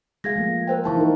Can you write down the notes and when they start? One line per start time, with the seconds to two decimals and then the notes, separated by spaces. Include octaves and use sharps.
0.24 G#3 G#4 F5 G#6 A#6
0.36 F3 A3 A#3
0.67 A#4 C5 G5
0.84 E3 E4 C5 F5 A5 C#6
0.97 D#4 A#4